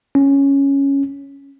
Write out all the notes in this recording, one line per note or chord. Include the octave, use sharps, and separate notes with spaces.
C#4